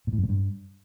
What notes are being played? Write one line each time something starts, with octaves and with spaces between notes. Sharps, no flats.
A#2
A2
F#2
A#2
G2